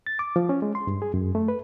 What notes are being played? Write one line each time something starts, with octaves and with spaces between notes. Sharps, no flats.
A6
D6
F3
C#4
G#3
C6
G2
G#4
F#2
A3
B4